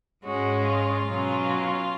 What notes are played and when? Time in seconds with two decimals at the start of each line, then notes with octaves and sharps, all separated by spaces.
0.24 G#2 G#3 C#4 F#4
0.67 F4
1.08 B2 F#3 C#4